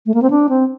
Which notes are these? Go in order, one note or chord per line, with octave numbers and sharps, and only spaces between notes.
A3
A#3
C4
D4
C4